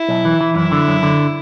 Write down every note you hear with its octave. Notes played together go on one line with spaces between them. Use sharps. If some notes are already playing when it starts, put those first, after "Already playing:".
Already playing: E4
B1
E3
E3
F#2 E4
D3
F#2
D3